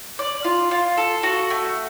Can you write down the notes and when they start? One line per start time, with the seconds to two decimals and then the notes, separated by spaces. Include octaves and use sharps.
0.19 D5
0.44 F4
0.71 F4
0.97 A4
1.23 F#4
1.50 A3